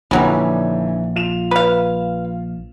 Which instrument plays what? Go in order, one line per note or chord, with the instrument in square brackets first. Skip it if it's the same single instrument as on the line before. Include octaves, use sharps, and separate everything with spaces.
[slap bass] A#1 [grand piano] D3 D#4 G#5 [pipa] E3 F#3 G3
[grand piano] F4 E7 F7
[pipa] B4 F5